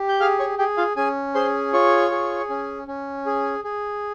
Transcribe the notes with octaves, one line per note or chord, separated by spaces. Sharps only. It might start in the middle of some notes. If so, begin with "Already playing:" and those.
Already playing: G4
G6
G#4 F5 F6
C#5 C#6
G4 G#4 G5
F4 F5
C#4 G#4 G#5
G#4 C5 C6
F4 C#5 C#6
G#4
C#4
C#4
G#4
G#4